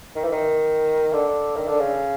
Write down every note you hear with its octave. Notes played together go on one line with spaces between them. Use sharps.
D#3
E3
D#3
D3
D#3
D3
C#3